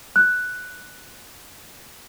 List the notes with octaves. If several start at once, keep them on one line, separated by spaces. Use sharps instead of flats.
F#6